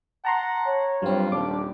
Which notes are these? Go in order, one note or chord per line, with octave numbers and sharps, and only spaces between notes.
F#5 A5 A#5 C6
C#5
G2 F#3 C4 F4
D#1 D4 D6